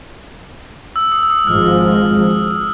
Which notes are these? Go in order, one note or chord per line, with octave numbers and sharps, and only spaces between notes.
E6
D#6
E6
D#6
G#1 G#2 F3 G#3 F6